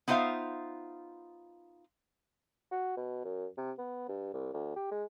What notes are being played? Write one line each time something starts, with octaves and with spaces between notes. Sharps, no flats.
B3 D#4 F4 C5 E5 F5
F#4
B2
F#2
C3
B3
G2
C2
D2
G4
G#3